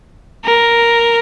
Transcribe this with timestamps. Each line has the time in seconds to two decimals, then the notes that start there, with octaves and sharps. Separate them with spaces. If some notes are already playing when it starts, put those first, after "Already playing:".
0.45 A#4